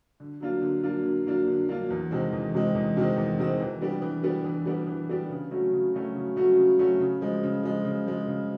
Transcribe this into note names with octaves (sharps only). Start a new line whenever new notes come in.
D3
F#3 A#3 D4 F4
D3
F#3 A#3 D4 F4
D3
F#3 A#3 D4 F4
D3
F#3 A#3 D4 F4
E2
C3 D#3 G#3 C4
E2
C3 D#3 G#3 C4
E2
C3 D#3 G#3 C4
E2
C3 D#3 G#3 C4
E3
G3 B3 D4 G4
E3
G3 B3 D4 G4
E3
G3 B3 D4 G4
E3
G3 B3 D4 G4
C#3
F#3 A3 C#4 F#4
C#3
F#3 A3 C#4 F#4
C#3
F#3 A3 C#4 F#4
C#3
F#3 A3 C#4 F#4
C#3
F3 G#3
C#3
F3 G#3
C#3
F3 G#3
C#3